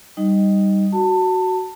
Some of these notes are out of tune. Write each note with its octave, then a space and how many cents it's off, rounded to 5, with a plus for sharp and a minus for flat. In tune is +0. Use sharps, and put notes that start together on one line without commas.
G3 +0 D#4 +0 D#5 +0
F#4 +5 A5 +25